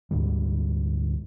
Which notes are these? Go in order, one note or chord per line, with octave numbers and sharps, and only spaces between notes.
D2 G#2 D3 G3